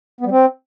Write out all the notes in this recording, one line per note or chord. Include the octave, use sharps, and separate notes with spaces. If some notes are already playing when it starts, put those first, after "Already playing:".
B3
G3
C4